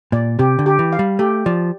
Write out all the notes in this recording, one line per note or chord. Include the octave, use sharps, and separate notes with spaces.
A#2 D5
C3 G4
D3
G4
E3
F5
G3
A3 G4
F3 D5